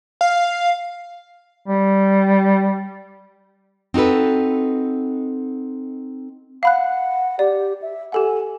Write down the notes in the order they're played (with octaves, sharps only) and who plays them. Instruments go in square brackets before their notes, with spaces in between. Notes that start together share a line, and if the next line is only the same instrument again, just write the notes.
[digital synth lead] F5
[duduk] G3
[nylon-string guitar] C4 D#4 F#4 A4 B4
[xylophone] F5 B5 F#6 [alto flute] F#5
[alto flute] G4 [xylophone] D5
[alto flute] E5
[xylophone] G4 A4 F#5 [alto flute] G#5